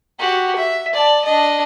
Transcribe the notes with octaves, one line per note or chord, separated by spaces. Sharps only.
F#4 G4
E5
D5 A5
D4 D#5